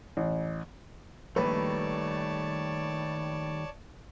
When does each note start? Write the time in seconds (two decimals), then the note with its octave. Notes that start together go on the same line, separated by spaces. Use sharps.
0.17 A1
1.36 A#1 D#3 G3 A3 B4 C#5 D5 A5